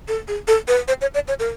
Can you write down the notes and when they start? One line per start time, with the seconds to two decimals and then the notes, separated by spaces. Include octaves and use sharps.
0.08 A4
0.28 G#4
0.48 A4
0.68 B4
0.88 C5
1.01 C#5
1.14 D5
1.28 C#5
1.40 A#4